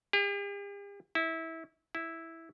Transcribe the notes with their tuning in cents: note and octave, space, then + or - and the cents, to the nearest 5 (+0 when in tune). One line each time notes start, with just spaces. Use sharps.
G4 +45
E4 -20
E4 -5